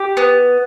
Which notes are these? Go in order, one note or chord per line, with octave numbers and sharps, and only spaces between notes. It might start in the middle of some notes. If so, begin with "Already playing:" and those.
Already playing: G4
B3